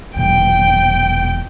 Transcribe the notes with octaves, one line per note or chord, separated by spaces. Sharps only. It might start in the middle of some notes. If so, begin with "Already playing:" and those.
E1 A#2 F#3 G5